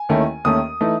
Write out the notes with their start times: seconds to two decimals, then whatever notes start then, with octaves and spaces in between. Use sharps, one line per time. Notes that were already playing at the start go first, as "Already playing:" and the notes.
Already playing: G#5
0.09 D#2 D#3 A3 C#4 E4
0.45 D#2 D#3 A3 C#4 D#6
0.81 E3 A3 D#4